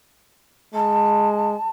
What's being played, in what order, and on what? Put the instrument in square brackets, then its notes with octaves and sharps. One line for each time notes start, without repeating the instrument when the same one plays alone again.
[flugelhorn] G#3 [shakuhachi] A5